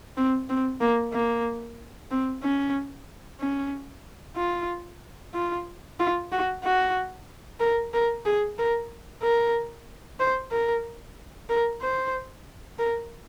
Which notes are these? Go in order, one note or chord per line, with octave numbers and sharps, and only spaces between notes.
C4
C4
A#3
A#3
C4
C#4
C#4
F4
F4
F4
F#4
F#4
A#4
A#4
G#4
A#4
A#4
C5
A#4
A#4
C5
A#4